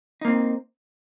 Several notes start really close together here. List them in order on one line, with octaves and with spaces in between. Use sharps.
D#4 A#3 C4